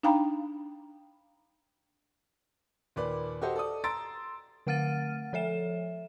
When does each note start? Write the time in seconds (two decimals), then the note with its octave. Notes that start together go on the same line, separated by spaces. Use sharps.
0.03 D4 D#4 F5 G5 A#5 B5
2.96 D#2 A#2 B4 D5 B5
3.41 F#4 G4 A4 C5 D#5
3.56 A4 D5 D#6
3.84 A#5 C6 E6 A6 D7
4.67 D3 A3 F#5 F6 A6 D#7
5.33 F3 A4 E5 E7